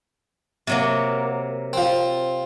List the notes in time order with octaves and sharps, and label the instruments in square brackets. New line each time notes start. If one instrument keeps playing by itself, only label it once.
[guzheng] C3 F#3 A#3
[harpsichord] C4 F4